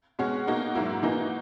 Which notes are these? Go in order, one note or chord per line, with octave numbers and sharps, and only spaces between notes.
B2 G#3 C#4 F#4
B2 A#3 D#4 F#4
G#2 F#3 A#3 E4
E3 A#3 D#4 F#4